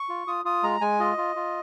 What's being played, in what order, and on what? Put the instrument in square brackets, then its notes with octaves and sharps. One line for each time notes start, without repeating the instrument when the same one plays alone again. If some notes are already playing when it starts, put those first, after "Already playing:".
Already playing: [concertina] C#6
F4
F4 D#6
F4 D#6
G#3 A#5
G#3 G#5
F4 D#5
F4
F4